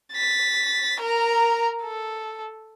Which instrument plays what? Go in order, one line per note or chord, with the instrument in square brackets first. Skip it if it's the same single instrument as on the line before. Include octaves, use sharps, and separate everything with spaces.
[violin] A6 B6
A#4 A#5
A4